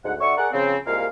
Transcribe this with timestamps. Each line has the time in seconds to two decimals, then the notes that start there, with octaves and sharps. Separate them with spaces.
0.05 D2 G#2 F#5
0.21 D3 F#4 E5 C#6
0.38 G#4 A#4 D5 F#5
0.53 C#3 F3 C4
0.87 C2 G#3 A#3 F4 F5